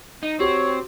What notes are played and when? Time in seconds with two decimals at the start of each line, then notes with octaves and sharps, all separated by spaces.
0.23 D#4
0.40 C4 F#4 G4 C#5